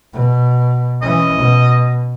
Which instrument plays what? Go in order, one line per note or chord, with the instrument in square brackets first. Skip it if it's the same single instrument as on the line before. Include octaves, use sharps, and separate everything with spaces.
[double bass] B2
[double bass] E3 C#4 [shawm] D#5
[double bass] B2